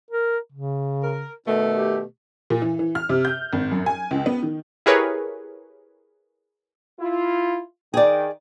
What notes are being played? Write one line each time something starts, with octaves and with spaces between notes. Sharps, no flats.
A#4
C#3
A#4
B2 D#3 A3
G4
A#2
E3
E3
F6
C3
G6
G#1
F#2
G#5
C#2
B3
D#3
E4 G4 G#4 A#4 B4 C#5
E4 F4
D#3 G#4 D5 G5